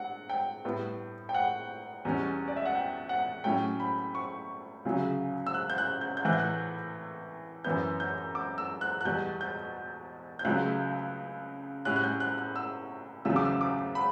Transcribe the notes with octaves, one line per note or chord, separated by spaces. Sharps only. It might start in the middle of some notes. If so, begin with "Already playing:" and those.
Already playing: G2 F#5
G5
A2 G3 B3
G5
F#5
E2 B2 G3 C#4
D5
E5
F#5
G5
F#5
A2 F#3 A3 C#4 G5
B5
C#6
D2 C#3 F#3
E6
F#6
G6
F#6
G6
G6
A2 E3 A3 F#6
G6
F#6
F#2 E3 B3 G6
G6
D6
E6
F#6
F#6
E2 B2 G3 G6
G6
G6
C#2 C#3 F#3 A3 F#6
A2 G3 C#4 F#6
F#6
G6
F#6
F#6
E6
E2 C#3 F#3 A3 E6
D6
E6
D6
B5